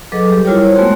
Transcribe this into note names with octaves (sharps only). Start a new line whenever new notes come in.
F#3 G#4 A4 B4 D#5 D6
G3 G4
G3 E4 F4 A#4 C#5 G5
C5 C#5
G#3 A3 B3 F#4 C6